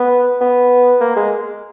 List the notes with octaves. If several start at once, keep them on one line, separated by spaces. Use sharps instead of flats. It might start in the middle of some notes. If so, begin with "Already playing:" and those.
Already playing: B3
B3
A#3
G#3